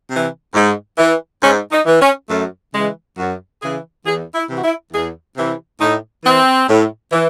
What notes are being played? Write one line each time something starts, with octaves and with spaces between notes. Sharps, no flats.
C3 E3
G#2
E3
G#2 C#4
D#4
E3
C#4
F#2 A3
C#3 E3 G#3
F#2 F#4
C#3 E3 G#4
E2 G#4
E4
C3 E3
F#4
E4
E2 G#4
C3 E3
A2 D#4
E3 C4
A2
E3